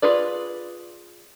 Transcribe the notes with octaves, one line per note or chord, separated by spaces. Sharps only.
F4 G#4 B4 D5